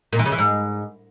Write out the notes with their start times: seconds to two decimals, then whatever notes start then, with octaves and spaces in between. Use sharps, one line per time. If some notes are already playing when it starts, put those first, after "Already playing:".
0.13 A#2
0.19 E3
0.25 C#3
0.32 E3
0.38 G#2